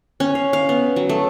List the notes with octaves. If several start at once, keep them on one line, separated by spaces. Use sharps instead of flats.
C#4
F5
F5
B3
F#3
A3